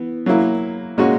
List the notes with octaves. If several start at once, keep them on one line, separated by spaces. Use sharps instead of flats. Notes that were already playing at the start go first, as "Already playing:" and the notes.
Already playing: E3 B3
F#3 A#3 E4
A#2 G#3 C#4 F#4